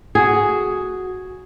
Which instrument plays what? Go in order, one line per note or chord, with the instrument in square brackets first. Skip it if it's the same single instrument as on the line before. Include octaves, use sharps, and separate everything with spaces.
[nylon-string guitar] F#4 G#4